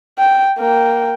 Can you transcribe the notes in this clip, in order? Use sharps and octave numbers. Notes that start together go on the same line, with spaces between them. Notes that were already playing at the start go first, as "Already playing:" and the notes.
G5
A#3 G5